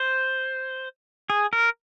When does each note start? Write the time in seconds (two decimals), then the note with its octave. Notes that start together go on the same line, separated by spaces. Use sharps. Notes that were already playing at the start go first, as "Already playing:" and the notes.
Already playing: C5
1.30 G#4
1.53 A#4